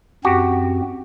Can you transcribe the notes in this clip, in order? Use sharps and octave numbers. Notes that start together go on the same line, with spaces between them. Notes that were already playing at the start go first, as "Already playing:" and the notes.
F#2 C4 F#4 G4